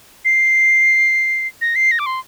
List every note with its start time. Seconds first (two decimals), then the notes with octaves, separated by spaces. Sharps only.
0.25 C7
1.61 A#6
1.76 C7
1.91 A#6
1.99 D6
2.06 C6